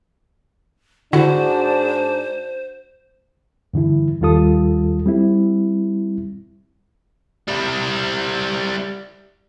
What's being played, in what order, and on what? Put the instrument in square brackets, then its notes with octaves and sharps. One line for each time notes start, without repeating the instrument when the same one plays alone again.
[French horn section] G#2 D4 [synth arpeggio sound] D3 E4 [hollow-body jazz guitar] F#4 [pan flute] C5
[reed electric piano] G2 D3 E3 E4
D#2 D#3 G3 F4 A4 D#6
G3 C4 E4
[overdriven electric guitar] G3 E4